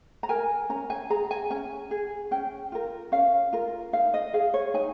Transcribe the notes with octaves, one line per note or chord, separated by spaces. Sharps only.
A#5
A#4 G#5
C#4 A#5
G#5
G#4 A#5
G#5
C#4 G#5
G#4
C#4 G5
F4 A#4
C#4 F5
F4 A#4
D#4 F5
D#5
G#4 F5
C#5
D#4 G#5